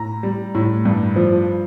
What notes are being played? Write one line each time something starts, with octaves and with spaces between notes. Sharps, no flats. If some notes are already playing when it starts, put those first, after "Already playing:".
Already playing: A2 A#5
G3
A2
G2
F3